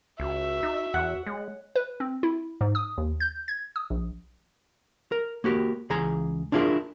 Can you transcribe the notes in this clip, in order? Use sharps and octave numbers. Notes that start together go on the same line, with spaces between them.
C#2 F#4 E5
D#4
E2 F#5
G#3 C#5
B4
C4
E4
G#2
D#6
D#2
G6
G#6
D#6
A#1
A#4
A#3 F#4 G4 A#4
C#2 E3 G#4 G#5 A#5
D4 E4 F4 G4 G#4 A#4